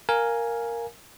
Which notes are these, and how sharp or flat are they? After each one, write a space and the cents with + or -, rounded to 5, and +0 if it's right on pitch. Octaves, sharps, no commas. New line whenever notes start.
A#4 +0 F5 +5 G#5 +0